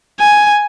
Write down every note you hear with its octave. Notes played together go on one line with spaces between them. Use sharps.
G#5